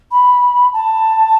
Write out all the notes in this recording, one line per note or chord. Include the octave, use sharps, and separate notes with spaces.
B5
A5